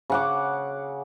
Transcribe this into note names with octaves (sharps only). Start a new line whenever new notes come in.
C#3 F#5 D6